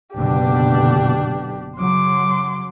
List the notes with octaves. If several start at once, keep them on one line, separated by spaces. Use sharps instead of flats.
F#1 B2 D3 D4 G4
C#3 F#3 C6 D6